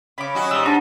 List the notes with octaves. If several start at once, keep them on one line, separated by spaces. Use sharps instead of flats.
C#3 B5 D6
F#3 C#4 F#4 D#5
G#2 G3 E6
D4 G#4 F#5 A5